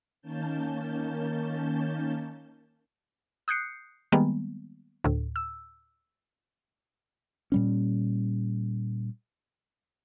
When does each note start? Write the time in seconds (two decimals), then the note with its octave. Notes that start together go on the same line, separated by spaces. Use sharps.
0.22 D#3 A#3 C#4 A5 G6
3.48 D#6 F#6 G6 C7 C#7
4.12 D#3 G3 G#3 A#3 B3
5.04 D2 A2
5.36 E6
7.52 A#2 G3 C#4